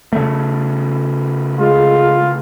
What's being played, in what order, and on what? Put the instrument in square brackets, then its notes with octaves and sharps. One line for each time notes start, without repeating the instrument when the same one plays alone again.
[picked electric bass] C#3 A3
[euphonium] G#3 [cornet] F4